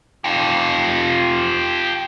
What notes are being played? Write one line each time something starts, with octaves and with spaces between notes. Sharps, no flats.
F4 G4